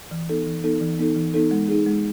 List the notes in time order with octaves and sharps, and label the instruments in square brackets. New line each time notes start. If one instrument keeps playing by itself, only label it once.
[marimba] E3
B3 D#4 A4
E3
B3 D#4 A4
E3
B3 D#4 A4
E3
B3 D#4 A4
G#3
D#4 G#4
G#3